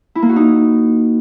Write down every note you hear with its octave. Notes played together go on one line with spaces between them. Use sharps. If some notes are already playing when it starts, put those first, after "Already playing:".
E4
A#3
F#4
D#4